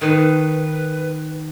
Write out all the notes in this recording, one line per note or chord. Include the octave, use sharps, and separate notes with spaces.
D#3 B4